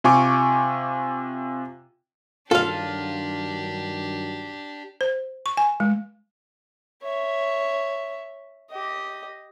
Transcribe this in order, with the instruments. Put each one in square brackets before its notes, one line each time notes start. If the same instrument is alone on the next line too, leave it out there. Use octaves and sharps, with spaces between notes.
[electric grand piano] C3 F4 G#5 C#6 D6
[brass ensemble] G2 D#3 F#3 [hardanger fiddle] D4 G4 [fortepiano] F4 [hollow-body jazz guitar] A4 F5
[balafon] C5
C#6
G#5
G#3
[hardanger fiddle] C#5 E5
G4 D#5